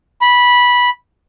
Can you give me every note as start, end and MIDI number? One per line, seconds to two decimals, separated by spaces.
0.21 0.89 83